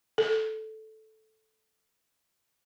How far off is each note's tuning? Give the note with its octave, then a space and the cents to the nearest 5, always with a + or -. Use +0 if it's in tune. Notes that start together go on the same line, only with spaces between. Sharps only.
A4 -5